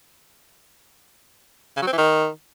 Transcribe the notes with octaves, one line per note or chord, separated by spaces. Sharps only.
C#3
F#3
C4
E3
D#3